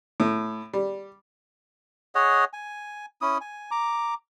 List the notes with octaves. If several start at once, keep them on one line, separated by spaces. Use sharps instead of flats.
A2
G3
G#4 C#5 D#5 F#5
G#5
C#4 E4 D#6
G#5
A#5 D6